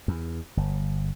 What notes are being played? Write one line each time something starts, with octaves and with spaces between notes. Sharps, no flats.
E2
G1